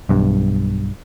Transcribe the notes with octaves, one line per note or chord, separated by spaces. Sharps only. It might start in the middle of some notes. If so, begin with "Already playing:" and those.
B1 G2